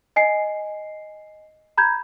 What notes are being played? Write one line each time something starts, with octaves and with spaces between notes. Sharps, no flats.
D#5 G#5 C7
A#5 B5 G6 G#6